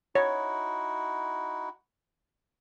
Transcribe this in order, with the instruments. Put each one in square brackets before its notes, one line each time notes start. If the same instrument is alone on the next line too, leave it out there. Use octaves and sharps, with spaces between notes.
[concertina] D#4 E4 F#4 [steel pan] C#5